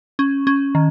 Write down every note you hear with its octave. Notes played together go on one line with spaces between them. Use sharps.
C#4
C#4
D#3